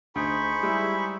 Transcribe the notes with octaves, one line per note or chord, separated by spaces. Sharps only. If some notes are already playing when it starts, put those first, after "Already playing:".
D2 D#4 G#4 C5 B5 C#6
G3 G#3 E4